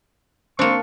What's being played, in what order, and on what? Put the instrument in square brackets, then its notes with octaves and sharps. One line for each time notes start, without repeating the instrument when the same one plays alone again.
[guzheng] A#3 D4 [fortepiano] C4 [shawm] C#6